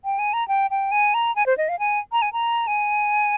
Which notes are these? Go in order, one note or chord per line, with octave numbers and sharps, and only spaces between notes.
G5
G#5
A#5
G5
G5
G#5
A#5
G#5
C5
D#5
F5
G#5
A#5
G#5
A#5
G#5